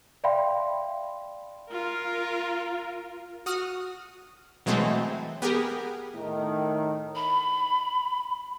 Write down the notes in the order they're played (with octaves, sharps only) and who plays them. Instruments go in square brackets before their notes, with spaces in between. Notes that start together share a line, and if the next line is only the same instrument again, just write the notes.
[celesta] D5 E5 F5 G5 B5 C6
[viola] F4 A#4
[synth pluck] F#4 D#6 F6
B2 E3 F#3 G#3 A3 C4
B3 G4 G#4 A#4
[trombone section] A2 D#3
[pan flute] B5